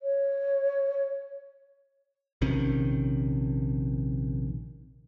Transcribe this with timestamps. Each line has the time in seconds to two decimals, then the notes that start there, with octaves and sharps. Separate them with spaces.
0.02 C#5
2.41 A#1 C3 D#3 C#4